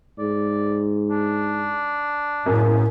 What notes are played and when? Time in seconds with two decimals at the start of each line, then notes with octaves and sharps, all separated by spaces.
0.19 G#2 D5
1.10 D4
2.46 F#1 F#2 A2